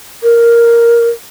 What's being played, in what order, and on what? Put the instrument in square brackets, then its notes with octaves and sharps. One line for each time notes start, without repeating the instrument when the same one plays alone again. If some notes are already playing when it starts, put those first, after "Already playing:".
[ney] A#4